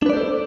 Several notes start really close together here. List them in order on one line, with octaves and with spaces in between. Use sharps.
D4 B4 D5 C5 A4